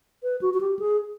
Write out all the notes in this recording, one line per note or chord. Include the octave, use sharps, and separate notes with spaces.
B4
F#4
F#4
G4
G#4